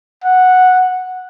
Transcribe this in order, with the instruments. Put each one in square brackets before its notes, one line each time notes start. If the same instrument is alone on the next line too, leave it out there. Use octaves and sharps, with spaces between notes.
[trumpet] F#5